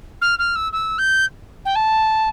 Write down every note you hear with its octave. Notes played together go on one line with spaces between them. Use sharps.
F6
F6
E6
E6
G6
G5
A5